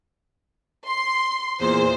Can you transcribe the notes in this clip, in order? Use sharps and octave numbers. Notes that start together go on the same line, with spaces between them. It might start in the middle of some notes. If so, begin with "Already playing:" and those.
C6
E2 A#2 C5